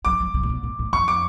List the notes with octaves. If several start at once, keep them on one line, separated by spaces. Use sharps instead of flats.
F#3 D6
F#3
C3
A#2
B2
A#2
A2
F2 C#6
D6